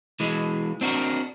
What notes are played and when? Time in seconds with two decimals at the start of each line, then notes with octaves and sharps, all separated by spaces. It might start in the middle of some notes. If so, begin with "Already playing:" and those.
0.20 E3 G#3
0.81 C4 D4 F#4 A#4